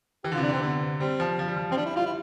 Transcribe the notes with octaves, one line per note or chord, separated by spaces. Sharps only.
E3 G4
D3 F4
C3
D4
D3 C4
D3 B3
G3 C4
F3
F3
G3
F3
F3 C4
G3 D4
E4
G3 F4
E4